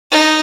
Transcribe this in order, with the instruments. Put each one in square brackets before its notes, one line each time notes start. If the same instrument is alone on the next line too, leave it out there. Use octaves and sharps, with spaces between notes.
[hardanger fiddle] D#4